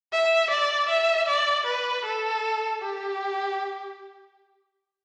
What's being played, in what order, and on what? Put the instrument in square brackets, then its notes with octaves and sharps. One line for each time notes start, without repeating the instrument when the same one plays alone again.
[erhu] E5
D5
E5
D5
B4
A4
G4